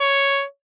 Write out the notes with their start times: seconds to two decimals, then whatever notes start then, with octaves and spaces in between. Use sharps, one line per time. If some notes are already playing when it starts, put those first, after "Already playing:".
0.01 C#5